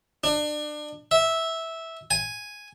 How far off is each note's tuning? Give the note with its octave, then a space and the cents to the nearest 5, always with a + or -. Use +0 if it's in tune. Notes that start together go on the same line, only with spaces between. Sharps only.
D4 +30
E5 -10
G#5 +0